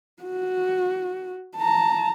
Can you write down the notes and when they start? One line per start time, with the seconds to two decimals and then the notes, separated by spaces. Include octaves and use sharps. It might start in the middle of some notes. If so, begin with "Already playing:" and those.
0.23 F#4
1.57 A5 A#5